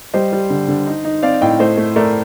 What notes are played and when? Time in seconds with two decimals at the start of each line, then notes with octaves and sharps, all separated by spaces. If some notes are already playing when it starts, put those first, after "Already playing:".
0.14 G3 C5 D#5
0.33 G3
0.50 D3
0.68 D3
0.87 D#4
1.05 D#4
1.23 C4 D5 F5
1.41 A2 D#5 G5
1.59 A3 C5 D#5
1.77 A3
1.96 A3 A#4 D5